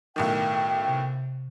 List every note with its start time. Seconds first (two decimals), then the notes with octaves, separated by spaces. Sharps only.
0.16 B1 A2 D#3 G5
0.87 C3